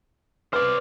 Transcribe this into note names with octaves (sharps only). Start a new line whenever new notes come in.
B4 C5 D5 F6